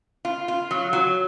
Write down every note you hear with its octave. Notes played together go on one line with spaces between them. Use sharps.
F4
F4
F#3
F#3